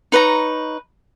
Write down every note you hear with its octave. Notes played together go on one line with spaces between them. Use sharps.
D#4 B4 C#5 A#5